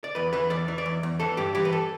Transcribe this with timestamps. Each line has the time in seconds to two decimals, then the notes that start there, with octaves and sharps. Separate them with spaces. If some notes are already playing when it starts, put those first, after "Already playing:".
0.04 D5
0.15 E2 B4
0.33 E3 B4
0.50 E2 D5
0.68 E3
0.78 D5
0.86 E2
1.03 E2
1.20 E3 A4
1.37 G2 G4
1.55 E3 G4
1.65 B4
1.72 A4